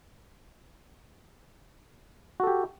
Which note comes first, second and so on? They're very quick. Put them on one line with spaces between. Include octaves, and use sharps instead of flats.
F#4 A4 G4